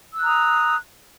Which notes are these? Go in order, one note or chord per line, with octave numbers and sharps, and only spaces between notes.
A#5 D#6 E6 F#6